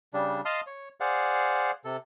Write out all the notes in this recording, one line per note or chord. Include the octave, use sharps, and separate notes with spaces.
C#3 G3 D4
D#5 F5 A5 C6 D#6 F6
C#5
G#4 C5 D5 F5 F#5
C3 A4